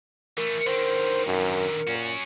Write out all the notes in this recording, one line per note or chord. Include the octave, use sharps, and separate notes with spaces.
E3 A3 A#4
D3 D#3 C5
F#2
A#2 C#4 F#4